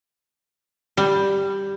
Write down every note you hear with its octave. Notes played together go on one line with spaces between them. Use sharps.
G3